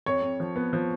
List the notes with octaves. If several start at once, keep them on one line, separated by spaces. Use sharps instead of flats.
F2 C#5
F2
F3
B3
F3